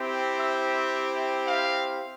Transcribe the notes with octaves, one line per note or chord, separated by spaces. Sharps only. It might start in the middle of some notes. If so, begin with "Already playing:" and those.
Already playing: C4 E4 G4
E5
F5